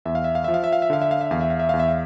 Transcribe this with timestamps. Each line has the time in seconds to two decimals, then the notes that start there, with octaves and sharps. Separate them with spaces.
0.05 E2 E5
0.15 F5
0.24 E5
0.35 F5
0.44 F3 E5
0.54 F5
0.64 E5
0.73 F5
0.82 E5
0.90 D3 F5
1.02 E5
1.11 F5
1.21 E5
1.31 E2 F5
1.41 E5
1.50 F5
1.59 E5
1.69 E2 F5
1.80 E5
1.88 F5